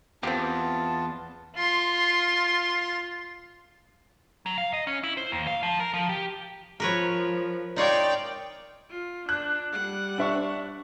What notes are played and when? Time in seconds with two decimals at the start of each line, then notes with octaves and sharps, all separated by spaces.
0.23 E2 B3 C4 F4 G4 A5
1.56 F4 C6
4.46 F#3
4.58 F5
4.73 D#5
4.87 C#4
5.04 E4
5.17 C5
5.32 D#2
5.47 F5
5.63 F3
5.80 A#4
5.93 F3
6.09 G4
6.80 F3 A#4 B4 C#5
7.76 D#4 F4 C#5 D5 G5
8.90 F4
9.29 D4 F#6
9.72 G3 F#5
10.18 D4 E5 C#6